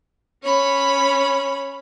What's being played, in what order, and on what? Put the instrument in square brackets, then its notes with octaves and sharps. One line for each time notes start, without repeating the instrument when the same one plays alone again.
[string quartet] C#4 C#5 B5